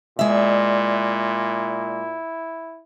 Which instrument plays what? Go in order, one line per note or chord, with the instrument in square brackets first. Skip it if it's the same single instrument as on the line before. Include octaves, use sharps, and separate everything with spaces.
[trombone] A#2 [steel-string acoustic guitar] G#3 E5 [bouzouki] D4 [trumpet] E4